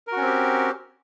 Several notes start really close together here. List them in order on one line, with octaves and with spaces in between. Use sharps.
A#4 F#4 C#4 C4 G4